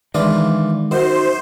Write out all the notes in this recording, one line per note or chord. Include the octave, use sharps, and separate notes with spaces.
D#3 E3 G#3 D4 F4
F#2 D#4 F#4 C5